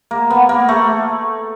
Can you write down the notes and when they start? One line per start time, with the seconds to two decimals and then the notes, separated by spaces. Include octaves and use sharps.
0.11 A#3
0.30 B3
0.49 A#3
0.69 A3